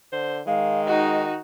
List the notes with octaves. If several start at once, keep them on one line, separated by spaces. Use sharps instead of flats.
D3 C5
D#3 G#3 F5
D#4 F#4 D#5